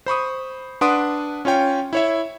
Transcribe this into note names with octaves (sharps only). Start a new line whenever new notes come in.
C5 B5 C#6 D#6
D4 B4 F#5 C6 D#6 D7
C#4 F4 C#5 G5
E4 C#5 E5